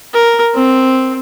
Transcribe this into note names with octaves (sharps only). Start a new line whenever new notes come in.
A#4
C4